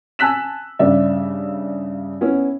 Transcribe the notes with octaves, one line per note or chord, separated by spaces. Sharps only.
G#5 A5 E6 F#6 B6 E7
G2 C#3 D5 E5
B3 C#4 E4